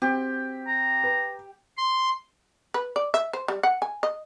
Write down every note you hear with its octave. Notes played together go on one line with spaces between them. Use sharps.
C4 G4
A#5
B4
C6
B4
D5
E5
C5
G3
F#5
G#5
D#5